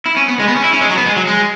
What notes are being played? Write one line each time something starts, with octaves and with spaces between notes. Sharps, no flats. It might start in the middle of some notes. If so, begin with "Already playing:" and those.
E4
C#4
B3
G#3
B3
C#4
E4
C#4
G#3
F#3
B3
G#3
F#3
G#3